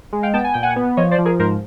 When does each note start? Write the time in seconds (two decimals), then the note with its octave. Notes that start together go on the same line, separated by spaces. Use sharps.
0.13 G#3
0.23 F5 G5
0.34 B3 G5 A5
0.44 G#5
0.54 A#2 G5
0.63 F#5 G#5
0.76 B3
0.97 F3 C#5 D#5
1.11 C5 D5
1.18 F3
1.25 G#4 A#4
1.39 G#2 A#4 C5